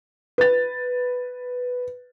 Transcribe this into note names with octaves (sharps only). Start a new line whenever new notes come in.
B4 A6